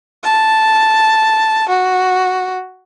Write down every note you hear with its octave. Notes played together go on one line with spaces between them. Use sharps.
A5
F#4